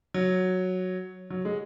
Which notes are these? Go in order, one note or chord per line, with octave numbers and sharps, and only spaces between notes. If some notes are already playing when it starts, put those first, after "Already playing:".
F#3
F#3
G#3